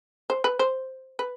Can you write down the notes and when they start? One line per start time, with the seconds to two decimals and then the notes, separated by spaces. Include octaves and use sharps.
0.30 C5
0.44 B4
0.59 C5
1.19 B4